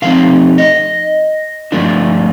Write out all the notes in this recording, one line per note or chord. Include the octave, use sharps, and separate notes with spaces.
D3 F3 A3 C4 D#4 F5
D#5
G2 F3 A3 D4 F4